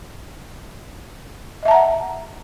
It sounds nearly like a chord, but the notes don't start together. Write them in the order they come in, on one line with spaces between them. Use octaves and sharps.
D#5 E5 A5 A#5 F#5